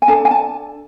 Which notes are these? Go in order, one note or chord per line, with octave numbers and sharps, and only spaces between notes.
G#5
D4 A4 A5
G#5
A5